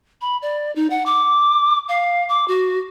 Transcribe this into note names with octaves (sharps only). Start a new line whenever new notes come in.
B5
D5
D#4
F#5
D6
F5
D6
F#4